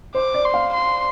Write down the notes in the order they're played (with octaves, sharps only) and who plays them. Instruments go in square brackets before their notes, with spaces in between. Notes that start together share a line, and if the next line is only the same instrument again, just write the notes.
[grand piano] C5 [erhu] D6
[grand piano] D5
[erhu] C6
[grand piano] F5
[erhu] C6